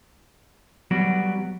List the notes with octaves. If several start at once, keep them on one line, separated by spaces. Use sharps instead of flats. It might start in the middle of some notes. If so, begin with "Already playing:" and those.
F#3 G3 B3 F#4 D5